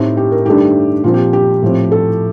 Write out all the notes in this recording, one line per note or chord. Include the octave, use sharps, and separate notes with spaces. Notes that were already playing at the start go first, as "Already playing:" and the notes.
Already playing: A2 A3 C4 D#4 G4
G4
A#4
G2 D#3 A3 D4 G4
A#2 F3 C4 F4
G4
G4
A2 F3 C4
A4